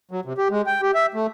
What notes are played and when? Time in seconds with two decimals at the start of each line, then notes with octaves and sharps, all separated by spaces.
0.11 F#3
0.25 C3
0.38 G4
0.50 G#3
0.67 G5
0.82 G4
0.94 E5
1.14 A3